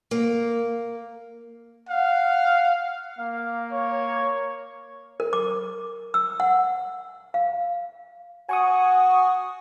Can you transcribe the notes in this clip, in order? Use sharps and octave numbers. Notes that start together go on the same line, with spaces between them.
A#3
F5 F#5
A#3 F5
C#5
A#4
D6
E6
F#5
F5
F#4 G#5 C#6 D#6